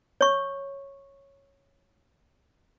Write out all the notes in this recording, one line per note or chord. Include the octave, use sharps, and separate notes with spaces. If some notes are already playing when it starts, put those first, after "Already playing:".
C#5 C#6